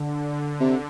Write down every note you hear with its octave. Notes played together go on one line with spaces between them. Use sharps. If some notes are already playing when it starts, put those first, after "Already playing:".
Already playing: D3
C3